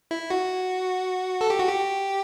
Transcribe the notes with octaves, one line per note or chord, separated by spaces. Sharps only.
E4
F#4
A4
G4
F#4
G4